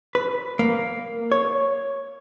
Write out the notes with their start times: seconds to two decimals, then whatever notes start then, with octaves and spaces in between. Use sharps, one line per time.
0.15 B4
0.59 A#3
1.32 C#5